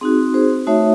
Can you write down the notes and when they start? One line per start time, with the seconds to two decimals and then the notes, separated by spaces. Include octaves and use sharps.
0.01 C4 D#4 F#4 G#4
0.34 G#4 C5
0.67 A3 D#4 F#4 C#5 E5